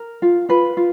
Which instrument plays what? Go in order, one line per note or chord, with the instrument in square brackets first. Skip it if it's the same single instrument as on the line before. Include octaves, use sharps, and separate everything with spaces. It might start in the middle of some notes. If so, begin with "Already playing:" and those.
Already playing: [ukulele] A#4
F4
F4 B4
F4